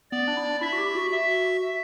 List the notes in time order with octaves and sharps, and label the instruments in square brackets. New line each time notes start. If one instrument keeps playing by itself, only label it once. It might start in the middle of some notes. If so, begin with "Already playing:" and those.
[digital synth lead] B3 [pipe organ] D5
[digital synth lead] D4
E4
D4
[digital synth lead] E4 [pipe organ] E5
[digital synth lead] F#4
G4
F#4
[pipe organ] E5